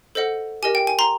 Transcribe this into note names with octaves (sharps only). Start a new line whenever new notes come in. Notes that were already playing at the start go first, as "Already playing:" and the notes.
A4 C5 D#5 F#5
G4 A#4 D#5 G#5
G5
G#5
A#5 C6